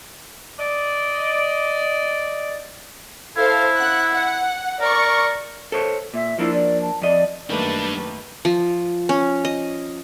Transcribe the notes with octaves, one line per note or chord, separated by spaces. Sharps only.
D5 D#5
E4 A4 C5 F5
F#5 F#6
F#5
A#4 D5 C#6
A4 C5 C#5
A#2 E5
F3 A#3 D4 E4
D5
A5
F2 D5 D#5
F#2 D#3 G3 A3 A#3 D4 B4 A5
F3
C#4
D#5